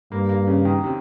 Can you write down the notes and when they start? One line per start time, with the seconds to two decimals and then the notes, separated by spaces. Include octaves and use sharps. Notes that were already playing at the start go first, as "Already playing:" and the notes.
0.12 G2 A#3
0.29 A#3
0.47 C#3
0.65 D#3
0.83 C3